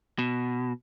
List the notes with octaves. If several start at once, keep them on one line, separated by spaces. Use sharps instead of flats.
B2